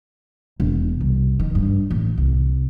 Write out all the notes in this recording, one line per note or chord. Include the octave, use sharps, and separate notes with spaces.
E1
C2
D#3
G2
A1
C2